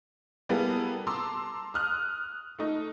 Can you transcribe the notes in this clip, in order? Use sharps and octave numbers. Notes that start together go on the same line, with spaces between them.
G3 A#3 B3 E4 G#4 A4
A5 A#5 C6 D6 E6
D#6 F6 F#6
A3 D#4